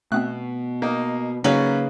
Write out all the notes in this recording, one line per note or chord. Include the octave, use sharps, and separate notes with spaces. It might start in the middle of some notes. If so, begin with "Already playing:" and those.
B2 A3 B3 C4 F#6
A#3 D#4
C#3 F#3 A#3 C#4 D#4 B4